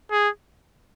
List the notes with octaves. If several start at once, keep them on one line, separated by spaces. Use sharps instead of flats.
G#4